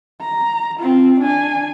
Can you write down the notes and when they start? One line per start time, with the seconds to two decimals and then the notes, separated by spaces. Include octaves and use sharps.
0.21 A#5
0.80 C4 F4
1.20 D4 G#5